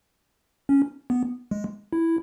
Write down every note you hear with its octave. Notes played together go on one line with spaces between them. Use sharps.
C#4
B3
G#3
E4